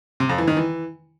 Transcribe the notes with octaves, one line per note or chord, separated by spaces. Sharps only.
C3
F2
E3
D#3
E3